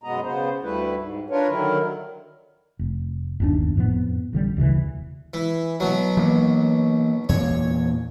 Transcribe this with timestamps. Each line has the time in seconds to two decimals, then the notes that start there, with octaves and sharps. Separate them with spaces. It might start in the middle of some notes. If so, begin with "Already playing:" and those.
0.04 F#2 B2 G#3 B3 D#5 A#5
0.24 C#3 B3 C5
0.63 D2 G3 A3 E4 B4
0.96 G#2
1.30 D4 F4 A#4 B4 C#5
1.48 D3 D#3 F#3 E4 A#4
2.79 F1
3.40 G1 D#2 D4
3.76 F2 A2 F3 B3
4.33 A1 D3 G3
4.57 E1 D2 C#3 E3
5.34 E3
5.80 B2 F#3
6.17 E3 A#3
7.29 E2 A#2 C#5